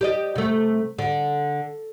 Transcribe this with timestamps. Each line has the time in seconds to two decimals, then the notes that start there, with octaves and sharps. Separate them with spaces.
0.01 G4 D5 D#5
0.36 C3 A3
0.99 D3